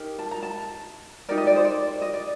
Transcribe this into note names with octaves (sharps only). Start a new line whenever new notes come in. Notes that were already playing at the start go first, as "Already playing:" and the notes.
Already playing: D#4 G4 A#4
A5
A#5
A5
D#4 G4 A#4 D5
D#5
D5
C5
D5
D#5
D5